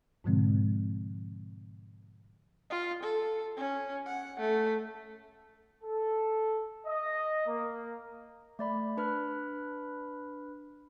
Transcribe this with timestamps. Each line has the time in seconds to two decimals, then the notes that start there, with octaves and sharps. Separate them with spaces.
0.24 G#2 B2 D3 F3 G#3 C4
2.70 F4
3.03 A4
3.57 C#4
4.06 F#5
4.40 A3
5.83 A4
6.86 D#5
7.47 A#3
8.59 A3 D5 B5
8.97 D4 B4 B5 F6